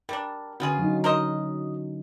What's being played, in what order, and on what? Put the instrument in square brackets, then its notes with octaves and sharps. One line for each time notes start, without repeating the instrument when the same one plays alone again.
[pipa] G3 D4 [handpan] A#4
[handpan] D3 C#4 F#4 [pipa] B3 F4 G#4
[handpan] F#3 D#4
[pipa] A#4 C5 D#5